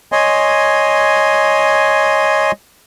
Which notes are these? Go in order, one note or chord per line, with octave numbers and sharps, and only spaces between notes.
C#5 D#5 G#5 C6